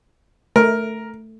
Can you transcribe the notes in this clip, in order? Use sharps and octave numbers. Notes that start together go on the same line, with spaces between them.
A3 A#4